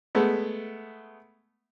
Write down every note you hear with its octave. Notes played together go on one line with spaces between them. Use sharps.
G#3 A3 B3